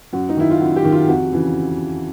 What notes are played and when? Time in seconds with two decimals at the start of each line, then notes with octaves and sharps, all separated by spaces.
0.13 F#2 F#4
0.29 D#4
0.37 D#3 E4
0.51 F4
0.60 F#2 F#4
0.76 G4
0.84 D#3
0.92 F4
1.08 F2 F#4
1.32 C#3 E3